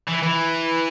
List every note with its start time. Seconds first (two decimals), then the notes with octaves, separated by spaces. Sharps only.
0.08 E3
0.23 E3